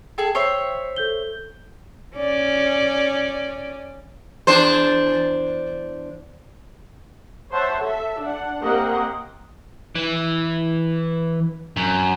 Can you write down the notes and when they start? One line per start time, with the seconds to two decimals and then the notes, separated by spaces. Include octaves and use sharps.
0.18 G#4 A4 G5
0.35 C5 C#5 E5
0.96 A4 G6 G7
2.17 C#4 D5
4.47 E2 D4 C5
7.52 C5 C#5 E5 F#5 A5
7.82 A4 E5
8.21 D4 F#5
8.62 A#3 C4 G4 A#4 D#5 F#5
9.95 E3
11.76 F#2